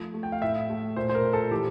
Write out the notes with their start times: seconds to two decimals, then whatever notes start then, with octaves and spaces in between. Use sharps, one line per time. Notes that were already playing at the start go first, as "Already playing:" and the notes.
Already playing: F3 A3
0.14 A3
0.23 G5
0.32 F5
0.42 A2 E5
0.70 A3
0.96 A#2 C5
1.09 C5
1.15 A#4
1.24 A#2
1.33 A4
1.51 E3 G4